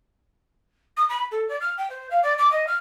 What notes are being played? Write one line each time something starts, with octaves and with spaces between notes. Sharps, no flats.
D#6
B5
A4
D5
F6
G5
C5
F5
D5
D6
D#5
F6